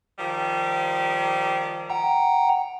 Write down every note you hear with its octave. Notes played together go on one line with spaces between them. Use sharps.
D#3 F3 G3
F#5 G5 A#5